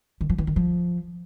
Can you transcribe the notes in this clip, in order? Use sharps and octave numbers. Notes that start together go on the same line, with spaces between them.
D#3
F3
E3
D#3
F3